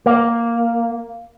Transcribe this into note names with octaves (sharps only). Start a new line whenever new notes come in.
A#3